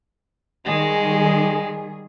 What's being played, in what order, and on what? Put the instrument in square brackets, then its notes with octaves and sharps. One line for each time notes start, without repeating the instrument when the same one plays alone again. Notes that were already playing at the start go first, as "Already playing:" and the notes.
[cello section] D#3 G3 G#4 [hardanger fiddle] G#3